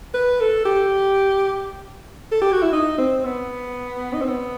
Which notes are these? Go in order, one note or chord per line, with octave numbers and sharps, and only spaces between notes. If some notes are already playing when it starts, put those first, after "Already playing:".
B4
A4
G4
A4
G4
F#4
E4
D#4
C4
B3
D#4
C4
B3